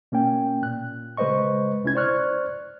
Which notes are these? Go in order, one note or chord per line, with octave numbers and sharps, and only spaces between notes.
B2 A#3 C#4 G5
A#2 F#6
C#3 G#3 B4 C5 D#5 C#6
C2 C3 C#4 E4 G#6
C5 D5 C#6 F6 F#6